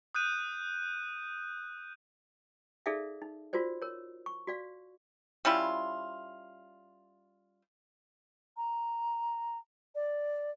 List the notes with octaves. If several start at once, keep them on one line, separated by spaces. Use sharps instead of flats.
D#6 F#6 G6 D#7
D#4 G#4 A4 D5 E5 F5
D#4
F4 F#4 A#4 C5 D5
A#4 C#5
C#6
F#4 D5 F5
G3 C#4 E4 F4
A#5
D5